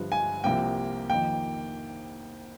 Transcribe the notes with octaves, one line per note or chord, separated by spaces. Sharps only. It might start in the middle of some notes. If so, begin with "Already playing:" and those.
Already playing: G1 G2 F3
G#5
C2 C3 F3 A#3 G5
F2 D#3 A#3 G5